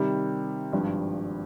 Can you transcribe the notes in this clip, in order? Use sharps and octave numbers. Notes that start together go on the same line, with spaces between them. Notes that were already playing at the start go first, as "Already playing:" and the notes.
Already playing: C3 D#3 G3
G#1 G2 F3